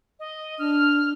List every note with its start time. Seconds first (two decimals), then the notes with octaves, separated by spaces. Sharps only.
0.20 D#5
0.59 D4 F6